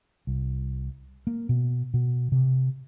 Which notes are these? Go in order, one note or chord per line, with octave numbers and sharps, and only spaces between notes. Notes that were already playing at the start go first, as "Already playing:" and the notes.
C2
A#3
B2
B2
C3